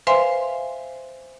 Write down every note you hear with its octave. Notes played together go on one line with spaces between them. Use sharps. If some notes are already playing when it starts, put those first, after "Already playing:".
B4 C5 E5 F5 G#5 C6